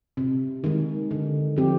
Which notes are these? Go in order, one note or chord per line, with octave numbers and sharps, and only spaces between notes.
C3
D#3 G#3
D3
F3 C4 G4